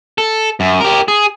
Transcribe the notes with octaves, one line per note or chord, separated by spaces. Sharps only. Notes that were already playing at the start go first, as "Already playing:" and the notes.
A4
F#2
G4 A#4
G#4